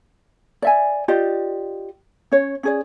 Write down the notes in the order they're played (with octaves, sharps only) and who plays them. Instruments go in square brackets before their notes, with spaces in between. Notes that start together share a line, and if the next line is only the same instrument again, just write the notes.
[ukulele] D5 E5 G#5
F4 G4 D5 D#5
C#4 C#5
C#4 G#4 D5